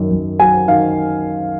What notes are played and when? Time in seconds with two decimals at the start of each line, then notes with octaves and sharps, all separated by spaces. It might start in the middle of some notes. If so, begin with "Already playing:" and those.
Already playing: F#2 D#3 F#3
0.11 F#2
0.40 F#3 G#5
0.68 D#3 F5